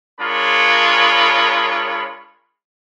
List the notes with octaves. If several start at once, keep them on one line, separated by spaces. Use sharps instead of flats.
G#3 D4 F4 A#4 C#5 B5